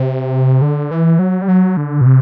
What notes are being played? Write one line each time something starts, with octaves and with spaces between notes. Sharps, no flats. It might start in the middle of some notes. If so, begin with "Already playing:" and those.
Already playing: C3
D3
E3
F#3
G3
F#3
D3
B2
C3